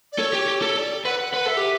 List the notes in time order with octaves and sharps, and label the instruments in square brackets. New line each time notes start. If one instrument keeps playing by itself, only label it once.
[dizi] D5
[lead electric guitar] A4 [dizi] C#5
[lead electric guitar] G4
G4
A4
[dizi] D5
[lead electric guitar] B4 [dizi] F#5
[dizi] F#5
[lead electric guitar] B4 [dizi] F#5
[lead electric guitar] A4 [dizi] E5
[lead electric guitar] G4